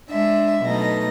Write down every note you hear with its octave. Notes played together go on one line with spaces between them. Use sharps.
G#3 D4 E5
B2 F#3 A3 D#4 A#6